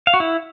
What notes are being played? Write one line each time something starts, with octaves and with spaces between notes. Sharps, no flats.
F5
F#4
E4